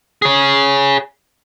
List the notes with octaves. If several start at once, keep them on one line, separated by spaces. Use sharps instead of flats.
G#4 C#5